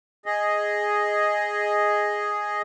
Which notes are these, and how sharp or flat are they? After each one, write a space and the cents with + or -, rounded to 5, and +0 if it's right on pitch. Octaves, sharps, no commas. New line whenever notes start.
G#4 +0 D#5 +0